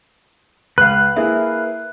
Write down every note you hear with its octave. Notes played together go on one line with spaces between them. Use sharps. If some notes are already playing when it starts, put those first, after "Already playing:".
C#2 B4 F5 F#6
A#3 E4 G#4 E5